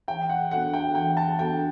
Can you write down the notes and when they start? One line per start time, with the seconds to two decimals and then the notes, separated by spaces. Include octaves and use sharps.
0.08 E3 G5
0.29 F#5
0.51 B3 D4 F#4 A4 F#5
0.73 G5
0.95 E3 G5
1.17 A5
1.39 B3 D4 F#4 A4 G5